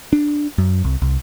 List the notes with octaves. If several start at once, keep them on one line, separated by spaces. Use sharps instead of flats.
D4
F#2
C2
C2